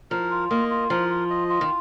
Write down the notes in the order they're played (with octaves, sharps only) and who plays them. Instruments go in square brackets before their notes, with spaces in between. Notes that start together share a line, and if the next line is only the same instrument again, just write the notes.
[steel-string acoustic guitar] F3 [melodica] A#4
[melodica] F4
[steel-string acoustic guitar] A#3 [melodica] D#5
[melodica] F4
[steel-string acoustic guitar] F3 [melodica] A#4
[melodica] F4
D#5
F4
[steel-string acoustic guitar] D#3